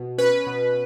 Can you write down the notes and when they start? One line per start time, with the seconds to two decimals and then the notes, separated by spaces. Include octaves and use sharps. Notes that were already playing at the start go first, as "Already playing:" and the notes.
Already playing: B2
0.18 C#4 B4
0.47 B2